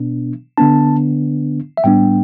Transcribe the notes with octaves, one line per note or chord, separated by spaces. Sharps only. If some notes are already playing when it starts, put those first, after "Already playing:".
Already playing: B2 B3 D4
D3 B3 D4 A5
E5
A2 G3 B3 D4 G5